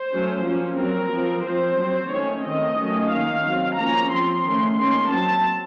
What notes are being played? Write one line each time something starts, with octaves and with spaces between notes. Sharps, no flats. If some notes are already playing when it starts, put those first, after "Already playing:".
Already playing: C5
F#3 A3 C#4
F3 A#3 C#4
F#3 C4 A#4
F3 C4
F3 C4 C5
F#3 C4
D#3 A3 C#4 C#5
D#3 A3 C4 D#5
D#3 F#3 A3 C#4
D#3 A#3 C#4 F5
F#3 C4
F3 A#3 C#4 A#5
F3 C4 C6
D#3 A3 C#4
D#3 A#3 C#4 C6
F#3 C4 A5